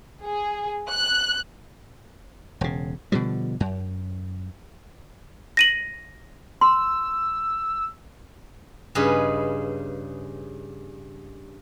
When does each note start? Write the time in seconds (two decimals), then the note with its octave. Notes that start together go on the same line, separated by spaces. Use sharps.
0.25 G#4
0.92 F#6
2.61 E1 C#3
3.12 B2 D3 F3 G3
3.60 F#2
5.57 A#6 D#7 F#7
6.61 C6 E6
8.95 G2 C#3 D#4 G#4 B4